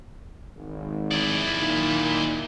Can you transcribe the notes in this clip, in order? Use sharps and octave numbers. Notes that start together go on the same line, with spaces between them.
G#1
E4 D5
A#2 D#3 D#4